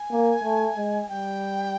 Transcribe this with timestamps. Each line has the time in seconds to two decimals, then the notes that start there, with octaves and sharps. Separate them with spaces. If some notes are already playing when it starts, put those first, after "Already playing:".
Already playing: G#5
0.11 A#3
0.43 A3
0.77 G#3
1.09 G3 G5